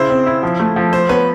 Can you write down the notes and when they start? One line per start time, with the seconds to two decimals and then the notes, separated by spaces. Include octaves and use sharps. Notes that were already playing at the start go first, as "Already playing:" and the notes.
Already playing: C#3 E4 C5
0.10 C4
0.26 E4
0.43 F3
0.60 A3
0.76 F3
0.93 F3 C5
1.09 B3 B4 C#5